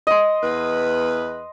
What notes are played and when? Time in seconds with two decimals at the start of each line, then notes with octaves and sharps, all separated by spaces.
0.07 D#5 C6
0.42 E2 B4